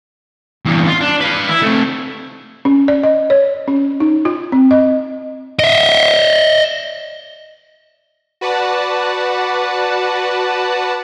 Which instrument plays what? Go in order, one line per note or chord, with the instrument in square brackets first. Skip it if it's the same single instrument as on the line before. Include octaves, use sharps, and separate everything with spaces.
[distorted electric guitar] E2 G2
F4
D4
B4 F5
E4
A3 C4
[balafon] C#4
D5
D#5
C#5
C#4
D#4
F4
C4
D#5
[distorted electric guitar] D#5 E5
[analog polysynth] F#4 B4 D5 F#5 A5